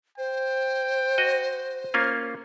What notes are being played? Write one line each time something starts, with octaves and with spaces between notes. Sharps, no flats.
C5 G5
F#4 D#5
A#3 C#4 F4